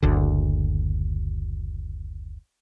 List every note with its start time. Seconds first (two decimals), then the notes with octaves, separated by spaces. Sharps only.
0.02 F#1 D2 D3